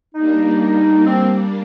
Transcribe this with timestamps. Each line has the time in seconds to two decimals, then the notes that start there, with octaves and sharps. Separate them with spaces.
0.15 G3 A#3 D4 D#4
1.05 C4